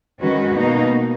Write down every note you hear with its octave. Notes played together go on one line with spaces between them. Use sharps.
D#3 G#3 C#4 F#4 B4
B2 A#3 D#4